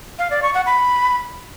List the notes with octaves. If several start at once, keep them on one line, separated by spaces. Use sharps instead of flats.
F5
D5
C#6
F#5
B5